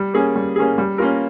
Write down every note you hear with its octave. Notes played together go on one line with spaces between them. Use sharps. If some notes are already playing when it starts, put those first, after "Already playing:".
Already playing: G3
A#3 C#4 G#4
G3
A#3 C#4 G#4
G3
A#3 C#4 F4 A#4